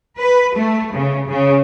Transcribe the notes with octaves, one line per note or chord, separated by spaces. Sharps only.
B4
A3
C#3
C#3